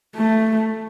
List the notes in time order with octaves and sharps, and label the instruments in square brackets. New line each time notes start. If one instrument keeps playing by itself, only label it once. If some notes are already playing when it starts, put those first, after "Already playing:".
[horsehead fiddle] A3